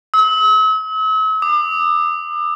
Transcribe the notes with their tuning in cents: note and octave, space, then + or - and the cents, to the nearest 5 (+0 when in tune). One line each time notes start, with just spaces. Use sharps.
E6 -45
D6 +40